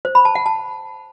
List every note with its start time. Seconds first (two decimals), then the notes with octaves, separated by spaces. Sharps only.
0.05 C5
0.15 B5
0.25 A5
0.35 F#5
0.46 A5